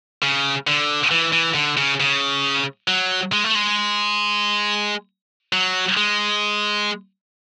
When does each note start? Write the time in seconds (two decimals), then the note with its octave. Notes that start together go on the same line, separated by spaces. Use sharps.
0.22 C#3
0.67 D3
1.11 E3
1.33 E3
1.55 D3
1.77 C#3
2.00 C#3
2.88 F#3
3.33 G#3
3.44 A3
3.55 G#3
5.53 F#3
5.97 G#3